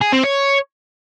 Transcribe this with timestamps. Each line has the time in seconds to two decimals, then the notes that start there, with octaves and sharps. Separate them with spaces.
0.01 G#4
0.12 C4
0.23 C#5